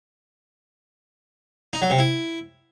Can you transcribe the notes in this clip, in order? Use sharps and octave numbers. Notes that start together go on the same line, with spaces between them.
D#4
F#3
C3
E4